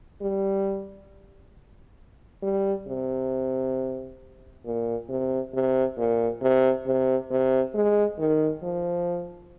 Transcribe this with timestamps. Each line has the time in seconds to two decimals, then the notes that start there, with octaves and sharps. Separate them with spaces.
0.22 G3
2.43 G3
2.88 C3
4.65 A#2
5.09 C3
5.54 C3
5.98 A#2
6.41 C3
6.86 C3
7.31 C3
7.75 G#3
8.19 D#3
8.63 F3